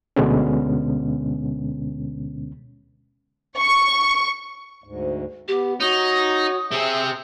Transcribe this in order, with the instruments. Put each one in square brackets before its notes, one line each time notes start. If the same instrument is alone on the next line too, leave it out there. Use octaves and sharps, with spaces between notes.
[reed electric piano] D2 B2 D3 G#3 B3 C#4
[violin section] C#6
[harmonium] D2 G#2
[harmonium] B3 [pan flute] G4
[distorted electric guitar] D#4 [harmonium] F#4 C#5 [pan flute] D#6
[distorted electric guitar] C3 C4 [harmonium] G#4 E5